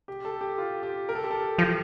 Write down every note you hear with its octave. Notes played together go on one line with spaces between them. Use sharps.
G4
A4
G4
F4
G4
A#4
A4
G4
A4
F3